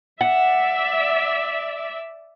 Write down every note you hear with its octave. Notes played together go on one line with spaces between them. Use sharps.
D5 E5 F#5